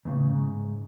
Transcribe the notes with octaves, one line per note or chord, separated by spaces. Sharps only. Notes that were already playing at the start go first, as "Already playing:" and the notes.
E2 A2 C#3
G#2